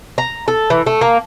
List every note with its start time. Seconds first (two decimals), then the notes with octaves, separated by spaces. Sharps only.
0.18 A#5
0.48 A4
0.70 E3
0.86 A3
1.01 A#3